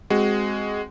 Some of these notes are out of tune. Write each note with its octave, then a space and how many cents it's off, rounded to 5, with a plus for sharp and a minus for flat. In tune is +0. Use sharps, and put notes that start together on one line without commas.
G#3 +0 C4 +0 F#4 +15